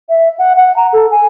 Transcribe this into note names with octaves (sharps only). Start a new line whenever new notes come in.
E5
F#5
F#5
A#5
A4
G#5